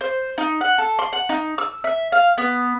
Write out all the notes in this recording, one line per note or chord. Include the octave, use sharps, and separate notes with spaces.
C5
D#4
F#5
A4
C6
F#5
D#4
E6
E5
F5
B3